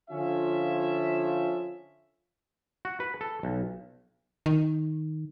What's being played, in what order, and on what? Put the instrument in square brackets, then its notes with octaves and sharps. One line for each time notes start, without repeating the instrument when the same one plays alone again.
[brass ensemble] D3 F3 C#4 F4 E5
[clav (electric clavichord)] F#4
B4
A4
B1
[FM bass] D#3